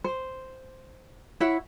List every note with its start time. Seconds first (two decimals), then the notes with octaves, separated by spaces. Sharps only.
0.04 C5
1.40 E4 C#5 E5 F#5